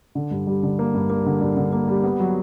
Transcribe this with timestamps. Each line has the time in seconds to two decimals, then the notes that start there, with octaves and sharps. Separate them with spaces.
0.15 D3
0.31 G2
0.47 G3
0.63 D3
0.79 A#3
0.94 G2
1.10 A#3
1.26 D3
1.41 G2
1.57 D3
1.73 A#3
1.88 G3
2.03 B3
2.20 F#3